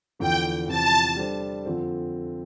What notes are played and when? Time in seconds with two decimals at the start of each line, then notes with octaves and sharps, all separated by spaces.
0.19 E2 D3 F3 G5
0.67 E2 C3 F3 A5
1.16 G3 D4 A4 C5
1.65 F2 D3 F3 C4 F4